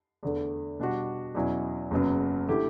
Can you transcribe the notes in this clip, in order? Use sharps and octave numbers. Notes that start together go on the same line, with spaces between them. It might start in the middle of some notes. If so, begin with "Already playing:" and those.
E2 D3 A3
B2 G3 D4 F#4
E2 B2 F#3 C#4 E4
F#1 F#2 C#3 F#3 B3
D3 A3 E4 G4